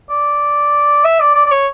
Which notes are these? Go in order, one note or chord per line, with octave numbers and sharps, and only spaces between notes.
D5
E5
D5
D5
D5
C#5